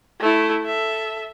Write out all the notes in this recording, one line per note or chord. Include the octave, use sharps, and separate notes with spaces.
A3 E4
A4 E5